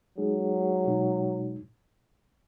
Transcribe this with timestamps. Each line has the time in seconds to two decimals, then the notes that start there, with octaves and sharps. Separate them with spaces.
0.17 F#3 G#3 D#4 G#4
0.87 B2 G#3 D#4